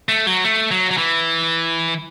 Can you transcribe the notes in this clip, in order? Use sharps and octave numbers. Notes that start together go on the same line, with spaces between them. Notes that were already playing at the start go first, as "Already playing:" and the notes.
A3
F#3
A3
F#3
F#3
E3